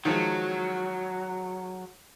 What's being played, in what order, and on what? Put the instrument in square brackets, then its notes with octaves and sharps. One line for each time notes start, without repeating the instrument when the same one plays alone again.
[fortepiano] D#3 F3 G#3 [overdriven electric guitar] F#3